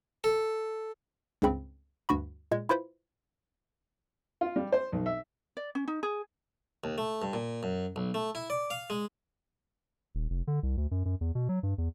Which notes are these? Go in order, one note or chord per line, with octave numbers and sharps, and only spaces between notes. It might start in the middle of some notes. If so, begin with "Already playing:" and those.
A4
C#2 G2 C#3 C4 B5
D2 G2 F#4 B5
A#2 G#3 G#6
E4 F4 B4 C5 B5
F4
G3
C5
B1
E5
D5
C#4
D#4
G#4
D#2
A3
G2
A#2
F#2
B1
A3
E4
D5
F5
G#3
D#1
F1
D3
C2
D2
F#2
F#2
E2
B2
F#3
G2
E2